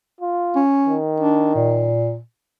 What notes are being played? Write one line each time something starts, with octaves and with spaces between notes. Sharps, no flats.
F4
C#4
D#3
D4
A#2